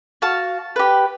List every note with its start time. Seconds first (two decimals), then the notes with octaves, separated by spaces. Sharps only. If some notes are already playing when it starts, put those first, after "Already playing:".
0.22 F#4 F5 A5
0.76 G4 B4